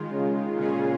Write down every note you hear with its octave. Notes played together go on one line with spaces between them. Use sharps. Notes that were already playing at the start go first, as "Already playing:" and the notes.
Already playing: D#3 G#3 F4
C#3
A#2 C#3 G#3 C#4 F4 G#4